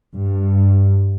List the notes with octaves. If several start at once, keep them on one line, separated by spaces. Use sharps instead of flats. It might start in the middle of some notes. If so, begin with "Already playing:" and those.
G2